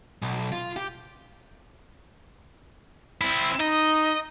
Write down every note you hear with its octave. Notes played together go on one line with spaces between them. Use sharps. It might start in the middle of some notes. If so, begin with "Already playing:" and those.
B1
F4
G4
C4 E4
D#4 D#5